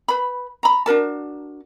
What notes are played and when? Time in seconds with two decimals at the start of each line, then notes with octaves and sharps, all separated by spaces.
0.08 B4 B5
0.63 A#5 B5
0.86 D4 F#4 A#4 A5